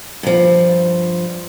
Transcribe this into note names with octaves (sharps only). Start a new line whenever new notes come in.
G2 F3